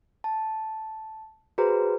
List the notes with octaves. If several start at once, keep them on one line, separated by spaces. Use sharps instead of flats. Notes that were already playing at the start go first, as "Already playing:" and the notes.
A5
F#4 G#4 B4 C5 A#5